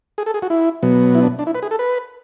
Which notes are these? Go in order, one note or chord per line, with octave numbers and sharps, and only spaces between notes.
G#4
A4
G#4
F#4
E4
B2 F#3 B3
E4
D4
D4
E4
B4
G#4
A4
B4